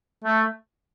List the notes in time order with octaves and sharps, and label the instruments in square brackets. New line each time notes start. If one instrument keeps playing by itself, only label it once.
[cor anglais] A3